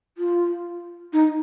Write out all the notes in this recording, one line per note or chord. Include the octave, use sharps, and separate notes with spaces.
F4
D#4